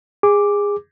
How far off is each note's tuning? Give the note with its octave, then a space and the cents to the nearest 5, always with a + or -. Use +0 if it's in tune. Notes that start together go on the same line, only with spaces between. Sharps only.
G#4 -20 D6 +0